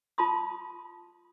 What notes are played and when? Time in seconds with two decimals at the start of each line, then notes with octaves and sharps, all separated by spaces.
0.18 F4 A5 B5 C6 D#6